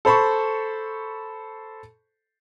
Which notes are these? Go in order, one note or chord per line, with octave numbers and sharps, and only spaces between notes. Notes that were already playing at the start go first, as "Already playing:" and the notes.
A4 C5 B5 C#6